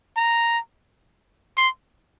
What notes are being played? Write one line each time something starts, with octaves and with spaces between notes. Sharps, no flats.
A#5
C6